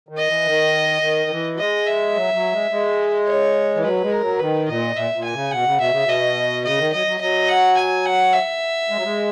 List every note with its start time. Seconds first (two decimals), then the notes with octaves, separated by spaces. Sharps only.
0.09 D#3
0.18 D#5
0.27 E3
0.46 D#3
1.02 D#3
1.30 E3
1.54 F#3
1.59 G#3 D#5
1.87 E5
2.14 F#3
2.34 F#3
2.52 G#3
2.71 G#3
3.27 C#5
3.75 E3
3.83 F#3 B4
4.02 G#3
4.12 A#4
4.21 F#3
4.39 D#3 B4
4.68 A#2 D#5
4.96 A#2 E5
5.14 A#2
5.24 G#5
5.33 C#3
5.51 B2 F#5
5.65 C#3
5.78 B2 E5
5.91 C#3
6.04 B2
6.09 D#5
6.64 C#3 D#5
6.78 D#3
6.93 F#3 D#5
7.07 F#3
7.21 F#3 D#5
7.48 F#5
7.77 G#5
8.05 F#5
8.33 E5
8.90 G#3
8.96 F#3
9.04 G#3